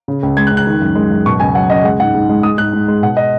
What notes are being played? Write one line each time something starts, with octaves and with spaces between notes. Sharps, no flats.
C#3
C#2
G#3 G#6
F#6
C#2
F#6
D#3
F#2
G#3
F#2
B2 C#6
C#2 G#5
F#3 F#5
C#2 D#5
G#3 F#5
G#2 F#5
G#2
G#3
G#3 D#6
G#2 F#6
G#2
G#3
B2 F#5
D#5